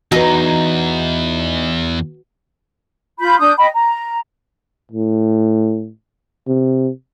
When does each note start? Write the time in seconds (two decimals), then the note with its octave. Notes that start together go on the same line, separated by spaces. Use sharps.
0.12 E2 D#4 F#4 B4
3.20 F4 B5 G6
3.40 D4 D#6 G6
3.57 D#5 G5 B5
3.73 A#5
4.92 A2
6.48 C3